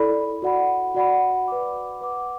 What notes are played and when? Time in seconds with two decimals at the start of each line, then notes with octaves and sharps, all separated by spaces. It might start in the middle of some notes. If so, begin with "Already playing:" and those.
Already playing: E4 A4 D5 B5
0.42 F#4 D5 F#5 B5
0.95 F#4 D5 F#5 B5
1.48 B4 F#5 D6
2.01 B4 F#5 D6